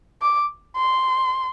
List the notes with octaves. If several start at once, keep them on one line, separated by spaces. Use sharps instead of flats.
D6
C6